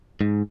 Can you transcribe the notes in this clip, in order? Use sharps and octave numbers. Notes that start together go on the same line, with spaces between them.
G#2